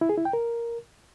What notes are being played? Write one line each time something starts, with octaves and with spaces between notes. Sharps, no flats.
E4
G#4
E4
G5
A#4